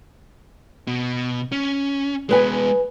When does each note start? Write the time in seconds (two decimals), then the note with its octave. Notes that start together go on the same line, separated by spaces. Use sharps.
0.87 B2
1.52 C#4
2.29 G#3 B3 G#4 B4 G#5